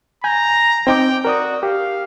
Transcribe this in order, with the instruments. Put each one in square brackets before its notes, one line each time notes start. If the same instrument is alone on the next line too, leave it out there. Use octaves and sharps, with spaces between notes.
[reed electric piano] G#5 G6 [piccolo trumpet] A#5
[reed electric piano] C4 D#4 D6 [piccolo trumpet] G5
[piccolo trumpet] F#4 [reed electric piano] A#4 D5 D#6
[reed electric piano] G4 [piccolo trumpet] F5